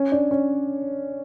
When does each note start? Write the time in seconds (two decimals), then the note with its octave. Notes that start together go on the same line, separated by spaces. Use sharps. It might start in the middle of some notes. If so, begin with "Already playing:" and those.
Already playing: C#4
0.12 D4
0.31 C#4